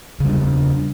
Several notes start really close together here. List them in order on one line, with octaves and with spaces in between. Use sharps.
C#3 G3 D4